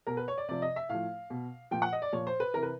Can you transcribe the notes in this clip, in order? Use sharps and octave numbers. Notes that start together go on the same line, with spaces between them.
B2 A#4
B4
C#5
D5
C3 F3 D5
D#5
E5
A2 F3 F5
B2
A#2 F3 G5
F#5
D#5
D5
A#2 F3 C#5
C5
B4
C3 E3 A#4
B4